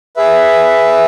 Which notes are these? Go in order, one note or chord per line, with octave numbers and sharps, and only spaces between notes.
G#4 B4 E5